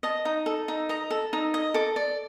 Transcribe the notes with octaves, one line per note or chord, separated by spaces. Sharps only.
D#5 A5
D#4
A4
D#4
D#5 A#5
A4
D#4
D#5
A4 D6
D5